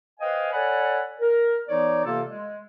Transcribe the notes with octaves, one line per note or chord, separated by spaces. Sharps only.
B4 C5 D#5 F5 G5 G#5
A4 C#5 D5 F#5 G#5 B5
A#4
E3 B3 D#4 C#5 D5
C3 E3 A#3 F4 A4
G#3